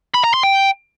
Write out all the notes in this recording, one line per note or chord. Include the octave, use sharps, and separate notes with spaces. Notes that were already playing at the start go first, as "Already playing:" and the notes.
B5
A#5
C6
G5